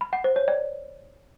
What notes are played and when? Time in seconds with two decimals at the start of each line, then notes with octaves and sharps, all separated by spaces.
0.01 B5
0.13 F#5
0.24 C5
0.36 C#5
0.48 D5